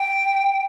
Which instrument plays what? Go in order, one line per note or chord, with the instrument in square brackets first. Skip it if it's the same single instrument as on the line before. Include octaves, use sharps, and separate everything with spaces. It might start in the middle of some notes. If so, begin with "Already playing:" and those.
Already playing: [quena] G5